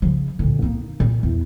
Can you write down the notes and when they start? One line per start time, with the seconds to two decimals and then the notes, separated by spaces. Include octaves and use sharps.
0.02 C#3 F3
0.39 D2 A#2
0.62 A#3 D#4
1.00 A#2
1.23 E2